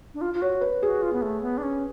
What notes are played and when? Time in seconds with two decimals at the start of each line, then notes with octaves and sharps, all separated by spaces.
0.14 D4
0.21 F4
0.34 F4
0.41 F#4 C#5
0.61 B4
0.82 F#4 G#4
1.02 F4
1.13 B3
1.22 A3
1.42 B3
1.58 D4
1.63 C#4